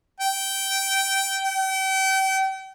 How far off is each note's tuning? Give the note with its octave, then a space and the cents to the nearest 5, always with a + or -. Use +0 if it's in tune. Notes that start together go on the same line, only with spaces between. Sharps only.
G5 -15
G5 -35